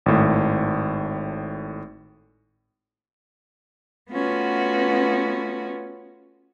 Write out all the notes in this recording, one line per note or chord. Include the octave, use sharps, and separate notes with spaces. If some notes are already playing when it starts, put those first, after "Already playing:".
G#1 A2
A3 B3 C#4 F4 F#4 B4